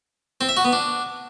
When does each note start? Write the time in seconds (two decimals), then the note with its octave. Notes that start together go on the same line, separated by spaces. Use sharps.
0.41 C4
0.49 E5
0.57 F#4
0.65 B3
0.73 D4